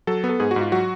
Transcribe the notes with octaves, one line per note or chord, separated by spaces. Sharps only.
F#3 A4
B3
A4
G#2 G#4
F#4
G#2
F4
F#3 F#4